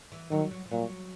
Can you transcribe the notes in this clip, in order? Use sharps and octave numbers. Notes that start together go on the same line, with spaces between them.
E3
D#3 F#3
F#3
F3
A#2 F#3